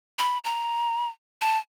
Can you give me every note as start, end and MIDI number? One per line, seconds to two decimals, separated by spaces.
0.19 0.38 83
0.44 1.08 82
1.41 1.58 81